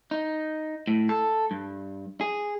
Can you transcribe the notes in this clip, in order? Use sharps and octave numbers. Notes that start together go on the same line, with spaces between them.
D#4
A2
A4
G2
G#4